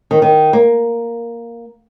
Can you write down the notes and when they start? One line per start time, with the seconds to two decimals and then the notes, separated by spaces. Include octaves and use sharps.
0.11 D#3
0.22 D#3
0.53 A#3